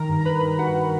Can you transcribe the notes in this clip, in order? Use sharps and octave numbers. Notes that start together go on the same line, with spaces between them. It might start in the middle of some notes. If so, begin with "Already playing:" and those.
Already playing: D#3 A#4 A#5
G2
A#5
G2 B4 B5
D#3
G2 F#4 F#5